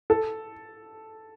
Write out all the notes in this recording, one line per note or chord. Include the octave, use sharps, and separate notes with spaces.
A4